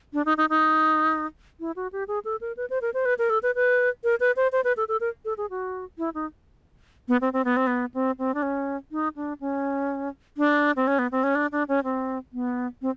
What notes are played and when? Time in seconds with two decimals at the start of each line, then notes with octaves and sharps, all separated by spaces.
0.13 D4
0.26 D#4
0.37 D#4
0.50 D#4
1.60 E4
1.76 F#4
1.92 G4
2.08 G#4
2.25 A4
2.41 A#4
2.57 B4
2.70 C5
2.82 A#4
2.94 C5
3.05 B4
3.18 A#4
3.30 A4
3.43 B4
3.55 B4
4.04 A#4
4.20 B4
4.36 C5
4.52 C5
4.64 B4
4.77 A4
4.88 A4
5.01 A#4
5.25 A4
5.38 G#4
5.50 F#4
5.98 E4
6.14 D#4
7.08 B3
7.21 C4
7.33 C4
7.45 B3
7.57 C4
7.67 B3
7.94 C4
8.19 C4
8.34 D4
8.42 C#4
8.92 D#4
9.16 D4
9.41 C#4
10.37 D4
10.76 C4
10.87 C#4
10.99 B3
11.12 C4
11.24 C#4
11.35 D4
11.52 D4
11.68 C#4
11.84 C4
12.33 B3
12.82 C4